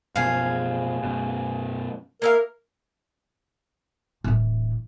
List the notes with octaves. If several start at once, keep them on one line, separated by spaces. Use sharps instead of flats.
F#2 B2 F3 G#4 F5
F#2 B2
A#3 E4 A#4 F5
D1 E3